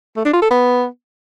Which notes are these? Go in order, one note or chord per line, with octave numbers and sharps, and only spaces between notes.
A3
D4
F4
A4
B3